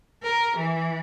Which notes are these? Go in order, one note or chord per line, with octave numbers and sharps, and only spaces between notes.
A#4
E3